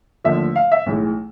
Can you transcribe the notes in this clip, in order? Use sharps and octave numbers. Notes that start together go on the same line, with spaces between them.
D#2 D3 F3 A3 E5
F5
E5
B1 A2 E3 G#3